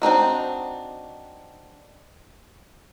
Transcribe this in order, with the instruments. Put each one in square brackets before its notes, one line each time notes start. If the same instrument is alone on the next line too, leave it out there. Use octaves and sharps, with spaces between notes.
[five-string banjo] C4 D4 D#4 F#4